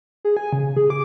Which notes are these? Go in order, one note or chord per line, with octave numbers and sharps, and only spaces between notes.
G#4
G#5
C#3
G#4
D6